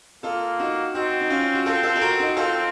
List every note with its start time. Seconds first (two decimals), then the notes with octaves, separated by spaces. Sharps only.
0.23 A#3 F4 A4
0.59 D#4 F#4
0.95 C4 D#4 F#4
1.21 D#4
1.30 C#4 F4
1.54 F#4
1.66 C4 F4 A4
1.83 F4 A4
1.96 A4
2.01 F#4 A#4
2.20 D#4 F#4
2.37 C4 F4 A4